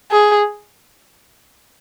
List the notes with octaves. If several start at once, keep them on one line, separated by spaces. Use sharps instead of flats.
G#4